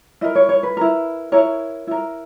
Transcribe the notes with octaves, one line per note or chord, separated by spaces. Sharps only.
E4 A#4 D#5
C#5
C#5
B4
E4 A#4
E4 A#4 C#5
E4 A#4